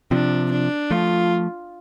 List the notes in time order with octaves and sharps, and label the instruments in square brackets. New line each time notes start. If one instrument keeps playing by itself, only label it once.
[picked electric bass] C3 F3 [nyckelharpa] D4
[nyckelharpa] D4
[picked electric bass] F3 A3 [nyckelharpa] F4